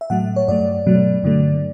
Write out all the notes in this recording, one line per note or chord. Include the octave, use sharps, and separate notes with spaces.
E5
A2 F#3 A3 F#5
C#5
G2 F#3 A3 D5
B2 F#3 A3
G2 D3 F#3 A3